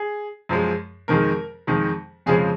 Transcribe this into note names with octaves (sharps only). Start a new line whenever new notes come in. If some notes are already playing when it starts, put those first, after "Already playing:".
Already playing: G#4
F#2 F3 G#3
F2 D#3 G#3 A#4
F2 D#3 G#3
F2 C#3 F3 G#3 G#4